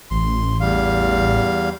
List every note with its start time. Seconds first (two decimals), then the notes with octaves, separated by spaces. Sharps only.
0.11 A1 C6
0.60 E2 G3 F5